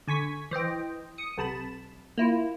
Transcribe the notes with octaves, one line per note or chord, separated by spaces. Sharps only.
D3 G#5 C#6 B6
E3 C5 D#5 G5
D#6 C#7
B1 C3 A5 B5 E7
A#3 E4 F4